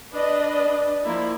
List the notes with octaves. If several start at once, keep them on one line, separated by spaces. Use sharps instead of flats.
D4 B4 D5 D#5
D5
F3 A#3 E4